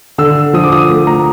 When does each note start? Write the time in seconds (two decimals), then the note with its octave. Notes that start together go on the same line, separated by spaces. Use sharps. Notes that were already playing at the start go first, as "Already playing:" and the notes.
0.18 D3 E6
0.53 F3 D#6
0.64 D6
0.72 D#6
0.90 A3
1.07 A#5